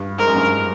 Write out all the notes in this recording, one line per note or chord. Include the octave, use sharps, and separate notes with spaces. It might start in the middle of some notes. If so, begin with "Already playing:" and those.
Already playing: G2
G#2 A#4
F#2
G2